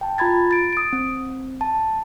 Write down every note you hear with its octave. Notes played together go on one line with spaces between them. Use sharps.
G5 A5
F4 A#5 B5 G#6 A6
A6 D7
D#6 D7
C4
A5